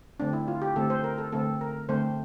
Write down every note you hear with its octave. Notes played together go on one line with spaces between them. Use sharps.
D3 A3 C4 D4
E4
F4
G4
D3 A3 C4 A4
C5
A#4
A4
D3 A3 C4 A4
A#4
D3 A3 C4 C5